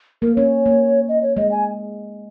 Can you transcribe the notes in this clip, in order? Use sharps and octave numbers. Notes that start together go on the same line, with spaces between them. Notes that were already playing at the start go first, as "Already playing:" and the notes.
A#3 A#4
C#4 C#5
A#3
D#5
C#5
G#3 D#5
G#5